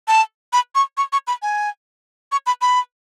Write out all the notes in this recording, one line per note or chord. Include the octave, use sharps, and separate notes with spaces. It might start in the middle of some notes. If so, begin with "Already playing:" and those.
A5
B5
C#6
C#6
C#6
B5
G#5
C#6
B5
B5